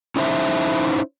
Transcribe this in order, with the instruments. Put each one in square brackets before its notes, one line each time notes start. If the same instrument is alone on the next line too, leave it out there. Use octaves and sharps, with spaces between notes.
[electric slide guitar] C#4 D#4 E4 C5 E5